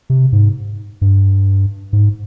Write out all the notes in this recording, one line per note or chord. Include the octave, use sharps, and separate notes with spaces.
C3
G#2
G2
G#2